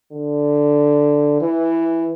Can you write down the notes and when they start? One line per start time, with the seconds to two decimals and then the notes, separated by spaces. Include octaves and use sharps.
0.13 D3
1.41 E3